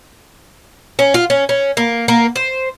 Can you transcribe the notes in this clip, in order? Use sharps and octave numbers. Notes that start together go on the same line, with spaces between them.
C#4
F4
C#4
C#4
A#3
A#3
C5